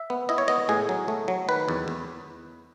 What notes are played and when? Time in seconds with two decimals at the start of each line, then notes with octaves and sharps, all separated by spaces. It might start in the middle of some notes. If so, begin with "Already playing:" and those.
Already playing: E5
0.10 B3
0.29 E4 D#5
0.38 C#5
0.48 B3 D#5
0.69 A2 G#4
0.89 F#3
1.08 A3
1.28 F#3
1.48 D#3 B4
1.68 E2
1.88 E2